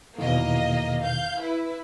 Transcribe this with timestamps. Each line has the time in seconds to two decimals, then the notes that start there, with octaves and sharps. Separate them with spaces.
0.18 E2 B2 D#3 A#3 D#5
1.02 F5 G6
1.39 E4 B4